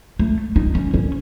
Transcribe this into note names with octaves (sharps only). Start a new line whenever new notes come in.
A3
D#4
C#4
C#4